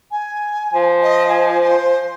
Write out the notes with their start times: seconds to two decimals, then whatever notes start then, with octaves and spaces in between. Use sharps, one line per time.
0.11 G#5
0.74 F3
1.03 D#5
1.29 G#5
1.62 C5